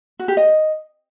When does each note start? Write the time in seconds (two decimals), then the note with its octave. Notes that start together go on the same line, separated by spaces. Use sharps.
0.19 F#4
0.28 G4
0.37 D#5